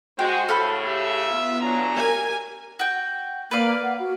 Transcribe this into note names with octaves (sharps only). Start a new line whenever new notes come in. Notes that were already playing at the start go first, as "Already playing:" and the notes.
G#3 F#4 C5 G5
A2 C#3 A4 F5 B5
G4 E5
B3 F4
C#3 F#3 D4 A#5
G4 A#4 G#5
F#4 G5
A#3 B4 D5 F5
F#5
F#4